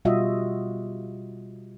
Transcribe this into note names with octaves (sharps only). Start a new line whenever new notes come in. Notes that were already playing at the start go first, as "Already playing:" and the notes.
B2 G3 F4 F#4 D#5 E5